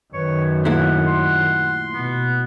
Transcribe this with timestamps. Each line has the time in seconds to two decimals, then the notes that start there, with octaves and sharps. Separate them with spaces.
0.14 F#2 D#3 B4 C#5
0.65 A#2 A3 E4 F#5
1.07 C6
1.94 B2 B3